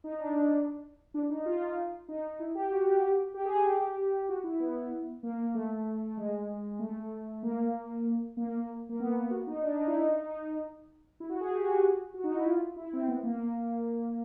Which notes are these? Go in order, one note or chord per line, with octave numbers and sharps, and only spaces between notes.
D#4
D4
D4
D4
D#4
F4
D#4
E4
G4
F#4
G4
G4
G4
G#4
G#4
G4
F#4
E4
B3
A#3
A3
G#3
A3
A#3
A#3
A#3
B3
F#4
D#4
D4
D#4
E4
D#4
D#4
E4
F#4
G#4
G4
F#4
F#4
D#4
E4
F4
E4
C4
B3
A#3